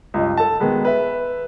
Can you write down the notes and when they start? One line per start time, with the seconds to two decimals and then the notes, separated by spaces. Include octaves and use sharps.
0.14 C#2 G2 D#5
0.37 A4 A5
0.60 B2 D#3 G#3 B3
0.85 B4 E5